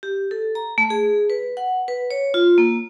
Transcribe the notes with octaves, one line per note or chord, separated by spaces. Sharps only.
G4
A4
A#5
A3
G#4
B4
F#5
B4
C#5
F4
A#3